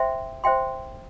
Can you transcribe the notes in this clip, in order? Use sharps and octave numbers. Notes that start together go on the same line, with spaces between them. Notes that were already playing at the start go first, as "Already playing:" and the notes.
Already playing: C5 E5 G5 C6
C5 E5 G5 C6